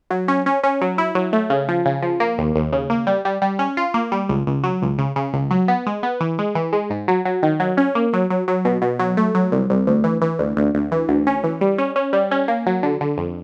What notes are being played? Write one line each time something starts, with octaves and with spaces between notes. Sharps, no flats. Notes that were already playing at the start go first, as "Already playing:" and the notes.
F#3
C#4
C#4
C#4
F#3
E4
F#3
A3
C#3
F3
C#3
F3
A#3
D#2
D#2
C#3
A#3
G3
G3
G3
C#4
F4
A#3
G3
C#2
C#2
F#3
C#2
C#3
C#3
C#2
F#3
B3
G#3
B3
E3
G#3
E3
G#3
G#2
F#3
F#3
D#3
F#3
C#4
A#3
F#3
F#3
F#3
B2
B2
F#3
A3
F#3
C2
C2
D2
E3
E3
D2
D2
D2
E3
D2
C#4
E3
G3
C#4
C#4
G3
C#4
A#3
F#3
D3
D3
F2